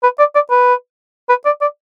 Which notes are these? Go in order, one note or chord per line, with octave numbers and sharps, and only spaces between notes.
B4
D5
D5
B4
B4
D5
D5